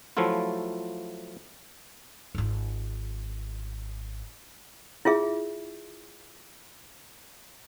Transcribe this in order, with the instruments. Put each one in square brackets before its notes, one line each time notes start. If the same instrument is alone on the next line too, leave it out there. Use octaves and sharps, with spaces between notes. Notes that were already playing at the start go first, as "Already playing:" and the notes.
[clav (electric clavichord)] F3 F#3 A3 E4 F4
[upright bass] G#1 F4
[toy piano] E4 F4 G#4 E5